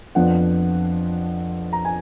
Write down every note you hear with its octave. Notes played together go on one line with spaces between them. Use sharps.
F2 F3 B3 D4 F#5
A#5
G#5